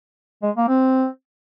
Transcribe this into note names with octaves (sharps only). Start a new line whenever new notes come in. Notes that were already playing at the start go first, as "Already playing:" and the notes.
G#3
A#3
C4